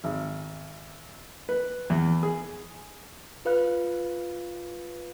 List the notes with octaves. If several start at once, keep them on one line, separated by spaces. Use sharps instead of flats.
G#1
B4
E2
G#4
F4 B4 F5 F#6